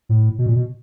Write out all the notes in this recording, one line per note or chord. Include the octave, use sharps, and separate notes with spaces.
A2
B2
A#2
B2